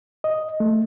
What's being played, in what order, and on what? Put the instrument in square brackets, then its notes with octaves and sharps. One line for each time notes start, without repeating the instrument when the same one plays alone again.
[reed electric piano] D#5
A3